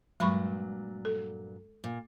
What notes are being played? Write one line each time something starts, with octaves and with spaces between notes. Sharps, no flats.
G2 A#2 F#3 G#3 B5 C#6
A4
A#2